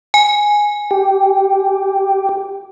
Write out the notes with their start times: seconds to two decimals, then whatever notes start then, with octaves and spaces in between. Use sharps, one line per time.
0.14 G#5
0.91 G4